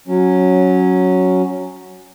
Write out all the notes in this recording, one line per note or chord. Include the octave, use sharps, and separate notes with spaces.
F#3 C#4